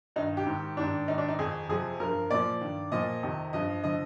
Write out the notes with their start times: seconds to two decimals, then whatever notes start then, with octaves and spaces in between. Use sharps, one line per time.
0.16 G2 D#3 D#4
0.37 G4
0.46 G#2 D#3
0.77 G#2 D#3 D4
1.08 G#2 D#3 D#4
1.18 D4
1.29 D#4
1.39 F2 D#3 G#4
1.69 F2 C3 F3 G#4
2.00 G2 F3 A#4
2.30 A#2 F3 D5
2.61 G2 D#3
2.92 A#2 F3 D#5
3.23 F2 C3 D#3
3.53 G2 F3 D#5
3.84 D3 F3 D#5